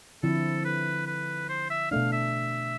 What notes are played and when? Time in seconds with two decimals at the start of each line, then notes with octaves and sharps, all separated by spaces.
0.23 D3 F3 C4 E4 A4
0.65 B4
1.07 B4
1.49 C5
1.70 E5
1.91 B2 A3 D4 F5
2.12 E5